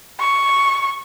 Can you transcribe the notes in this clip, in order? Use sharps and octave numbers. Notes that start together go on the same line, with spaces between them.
C#6